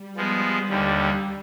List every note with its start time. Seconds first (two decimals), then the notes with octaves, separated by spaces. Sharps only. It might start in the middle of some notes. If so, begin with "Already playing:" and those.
Already playing: G3
0.16 F3 G#3 B3
0.69 D#2 D3 G3